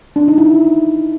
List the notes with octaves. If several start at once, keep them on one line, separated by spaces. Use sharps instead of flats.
D4
D#4
E4